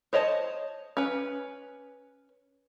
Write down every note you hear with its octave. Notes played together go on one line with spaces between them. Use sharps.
C5 C#5 D#5 A5
C#4 B4